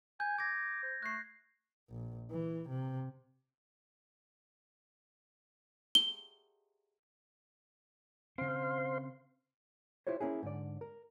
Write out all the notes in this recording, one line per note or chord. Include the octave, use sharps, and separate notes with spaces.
G#5 G6
D6 G#6 A#6
C5
A3 F#6 C7
A#1
E3
C3
G7
C#3 C4 C5 F5 C6
E4 F4 G4 C5 C#5
A#3 C#4 E4 G#4
G#2 D3 D5
A#4